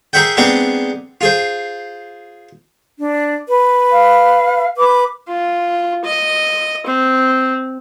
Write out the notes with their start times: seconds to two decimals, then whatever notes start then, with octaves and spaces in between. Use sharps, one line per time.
0.13 G#4 A#4 C5 E5 F#5 G5
0.37 G#3 B3 C4 D4 D#4 D#5
1.21 F4 G#4 C5
2.99 D4
3.49 B4
3.92 F5
4.77 B4 D6
5.28 F4
6.04 D#5
6.86 C4